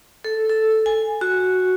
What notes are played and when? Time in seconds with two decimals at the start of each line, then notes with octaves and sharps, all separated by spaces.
0.25 A4
0.49 A4
0.86 G#5
1.21 F#4